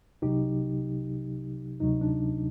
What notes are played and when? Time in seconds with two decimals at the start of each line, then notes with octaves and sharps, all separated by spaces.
0.22 C2 C3 F#3 D#4 G4
1.80 D2 C3 F#3 D#4
2.01 D4